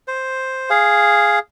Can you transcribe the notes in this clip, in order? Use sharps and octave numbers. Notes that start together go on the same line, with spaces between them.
C5
G#4 F5